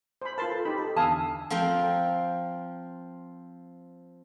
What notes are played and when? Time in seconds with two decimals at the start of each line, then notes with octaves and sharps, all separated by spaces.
0.22 C5 B5
0.38 F4 A#4 B4 A5 C6
0.50 A4
0.65 D#4 G4 B5
0.78 A4
0.96 E2 D3 F5 G#5 A5 D#6 E6
1.50 F3 C4 A#4 G5